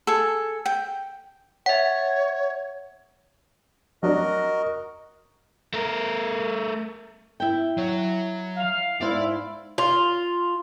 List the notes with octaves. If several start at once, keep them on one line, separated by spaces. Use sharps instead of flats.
G#4 A4
G5
C#5 E5 F#5
F#3 D4 F#4 A#4 D#5
A3 A#4
E4 G5
F#3 C#5
F5
G#2 E4 C5 D5 F5
F4